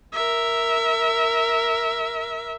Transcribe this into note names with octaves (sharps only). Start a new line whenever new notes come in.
A#4 E5